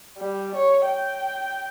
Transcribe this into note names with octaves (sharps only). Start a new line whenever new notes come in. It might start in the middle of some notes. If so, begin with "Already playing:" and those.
G3
C#5
G5